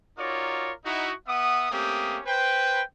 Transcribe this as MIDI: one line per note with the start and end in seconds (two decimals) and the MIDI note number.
0.18 0.71 63
0.18 0.71 65
0.18 0.71 66
0.18 0.71 70
0.18 0.71 73
0.18 0.71 74
0.85 1.12 63
0.85 1.12 64
0.85 1.12 66
1.28 1.69 59
1.28 1.69 76
1.28 1.69 78
1.28 1.69 87
1.71 2.18 57
1.71 2.18 58
1.71 2.18 60
1.71 2.18 61
1.71 2.18 67
1.71 2.18 87
2.26 2.82 71
2.26 2.82 72
2.26 2.82 79